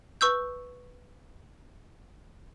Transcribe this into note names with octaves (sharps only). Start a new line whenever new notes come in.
B4 C#6 E6 G6